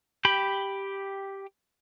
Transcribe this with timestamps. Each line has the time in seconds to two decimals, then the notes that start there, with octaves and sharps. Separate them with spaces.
0.25 G4 G5 B5